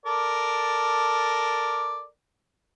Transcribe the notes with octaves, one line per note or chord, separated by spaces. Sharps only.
A4 A#4 D5